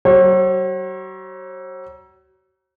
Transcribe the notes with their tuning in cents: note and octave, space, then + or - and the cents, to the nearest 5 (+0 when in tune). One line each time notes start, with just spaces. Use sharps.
F#3 +40 C#5 -45